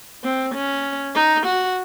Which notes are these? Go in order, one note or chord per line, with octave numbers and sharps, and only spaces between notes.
C4
C#4
D#4
F#4